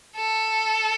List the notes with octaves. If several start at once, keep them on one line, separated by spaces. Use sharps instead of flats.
A4